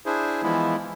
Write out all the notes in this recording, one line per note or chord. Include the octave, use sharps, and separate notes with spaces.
D4 E4 G#4 C5
E3 F3 G#3 B3 E4